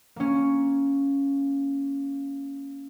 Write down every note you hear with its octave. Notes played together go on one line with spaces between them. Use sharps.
A#3 C#4